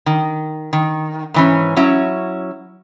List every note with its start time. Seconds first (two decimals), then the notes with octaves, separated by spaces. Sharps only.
0.06 D#3
0.73 D#3
1.34 G#2 E3 C#4
1.76 F#3 C#4 E4